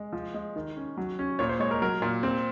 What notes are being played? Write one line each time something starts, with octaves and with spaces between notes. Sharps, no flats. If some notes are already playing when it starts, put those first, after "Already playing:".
Already playing: G#3
F3
G#3
D#3
C#4
F#3
C#4
A#2 C#5
C5
G#3 C#5
A#4
F#3 A#4
A#2
C4